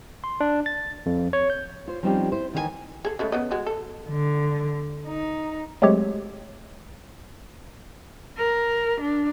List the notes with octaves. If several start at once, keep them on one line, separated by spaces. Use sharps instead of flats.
C6
D4
A6
F2
C#5
G6
F4 C5
F3 G3 C4 C#4 D#4 G4
E4 C5
D#2 D#3 E3 D#4 F#4 G#5
G#4 A4
C#3 G#3 A3
C#3 B3 D#5
G#3 F#4 D#5
A4
D3
D#4
F#3 G#3 A3 C4 G4 C#5
A#4
D4